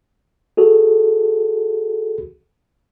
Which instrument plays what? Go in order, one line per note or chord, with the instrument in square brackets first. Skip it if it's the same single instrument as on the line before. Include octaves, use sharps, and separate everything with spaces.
[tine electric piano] F#4 G#4 A4